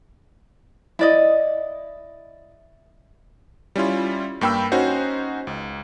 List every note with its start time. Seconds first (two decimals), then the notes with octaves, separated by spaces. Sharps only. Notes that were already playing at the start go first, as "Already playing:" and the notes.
0.99 E4 D5 D#5
3.76 G3 C#4 E4 F4
4.41 G2 A#3 G5 B5 E6
4.72 C#4 D#4 F#4 C5
5.47 C#2